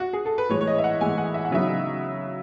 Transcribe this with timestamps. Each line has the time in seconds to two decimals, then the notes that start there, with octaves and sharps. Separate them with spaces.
0.00 F#4
0.13 G#4
0.26 A4
0.38 B4
0.49 A2 E3 G#3 C#5
0.61 C#5
0.67 D#5
0.78 E5
0.84 F#5
1.01 A2 E3 G#3 G#5
1.18 F#5
1.34 E5
1.45 F#5
1.51 C#3 F#3 B3 D#4 E5